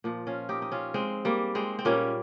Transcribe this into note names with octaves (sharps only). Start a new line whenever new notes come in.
A#2 F3
C#4 F4
D#4 G4
D#4
C#4 F4
G#3 C4
G3 A#3
G#3 C4
C4
A#2 G3 A#3 C#4